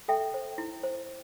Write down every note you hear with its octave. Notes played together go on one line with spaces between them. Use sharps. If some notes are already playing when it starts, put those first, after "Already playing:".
A4 E5 G5
C5
E4
C5